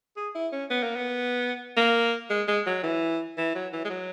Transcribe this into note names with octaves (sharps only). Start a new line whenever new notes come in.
G#4
E4
C#4
B3
A#3
B3
A#3
G#3
G#3
F#3
E3
E3
F#3
E3
G#3
F#3